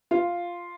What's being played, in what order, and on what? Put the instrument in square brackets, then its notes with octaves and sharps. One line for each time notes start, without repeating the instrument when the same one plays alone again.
[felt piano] F4